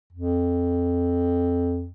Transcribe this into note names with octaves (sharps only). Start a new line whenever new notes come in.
F2